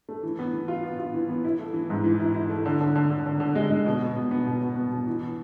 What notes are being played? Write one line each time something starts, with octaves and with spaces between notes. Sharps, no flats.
A3
E3
B3
E3
F4
B3
F4
E3
B3
E4
A3
E3
G#2
E3
E4
E4
A3
D3
D3
D3
D3
D3
D3
G#3
G#3
B2
B3
B2
B3
B2
B2
B3
B2
E3